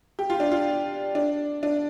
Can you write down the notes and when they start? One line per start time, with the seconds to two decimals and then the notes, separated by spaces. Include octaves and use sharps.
0.19 G4
0.30 F4
0.40 D4
0.52 F4
1.15 D4
1.63 D4